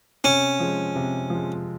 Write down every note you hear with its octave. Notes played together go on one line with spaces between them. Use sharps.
C3 C#4
F3 G#3
C3
F3 G#3